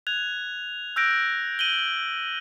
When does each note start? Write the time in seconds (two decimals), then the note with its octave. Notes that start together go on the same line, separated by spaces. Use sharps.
0.07 F#6 G#6 F7
0.96 E6 F#6 G6 A#6 D7
1.59 D#7 F#7 G7